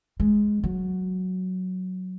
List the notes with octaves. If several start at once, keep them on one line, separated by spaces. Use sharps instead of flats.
G#3
F#3